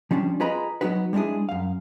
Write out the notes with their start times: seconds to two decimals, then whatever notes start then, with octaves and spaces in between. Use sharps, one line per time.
0.11 F3 G3 C#4 D4
0.40 F4 G#4 B4 D#5 A#5 B5
0.81 F#3 B3 C#4 D#4 F#4 B4
1.13 G3 G#3 D4 E4 G#4
1.49 F#2 F5